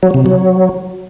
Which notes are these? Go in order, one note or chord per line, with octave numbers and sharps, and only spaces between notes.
F#3
C3
F#3